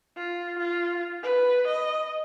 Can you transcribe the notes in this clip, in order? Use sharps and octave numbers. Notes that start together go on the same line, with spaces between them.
F4
F4
B4
D#5